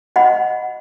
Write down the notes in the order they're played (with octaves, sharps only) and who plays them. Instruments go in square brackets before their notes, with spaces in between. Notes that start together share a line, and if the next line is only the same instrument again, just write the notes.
[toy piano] D#5 F#5 B5